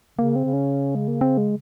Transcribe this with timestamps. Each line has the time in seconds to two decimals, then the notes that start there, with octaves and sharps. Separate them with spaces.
0.19 C#3 A#3
0.36 C4
0.45 C#3
0.53 C#4
0.95 G#3
1.08 A#3
1.21 C4
1.38 G#3